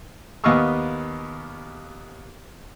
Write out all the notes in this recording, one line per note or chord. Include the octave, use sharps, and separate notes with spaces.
D#2 B3 D#5 F5 C#6 E6